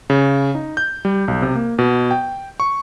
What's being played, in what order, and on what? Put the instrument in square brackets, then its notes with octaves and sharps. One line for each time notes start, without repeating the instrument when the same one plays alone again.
[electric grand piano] C#3
D#4
G6
G3
B1
C3
A#3
B2
G5
C#6